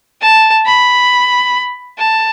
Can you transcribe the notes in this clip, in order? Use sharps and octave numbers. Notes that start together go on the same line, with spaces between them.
A5
B5
A5